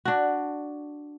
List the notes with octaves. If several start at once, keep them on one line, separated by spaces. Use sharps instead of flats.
D4 F#4